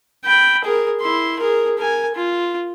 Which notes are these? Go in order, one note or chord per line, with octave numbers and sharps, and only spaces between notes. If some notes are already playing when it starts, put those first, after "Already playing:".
G5 B5
G#4 A#4
E4 C6
G#4 A#4
A#4 G#5
F4